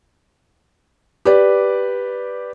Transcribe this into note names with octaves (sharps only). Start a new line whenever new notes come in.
G4 B4 D5